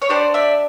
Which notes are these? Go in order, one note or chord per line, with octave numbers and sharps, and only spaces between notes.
C#5
D4 G4 C5 D5
D5 E5